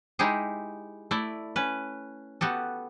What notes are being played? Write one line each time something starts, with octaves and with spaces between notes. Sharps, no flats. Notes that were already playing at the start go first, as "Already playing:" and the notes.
G#3 D#4 E4 G4 G#4
A3 E4 D5
C#4 B4
B3 F#4 G4 A4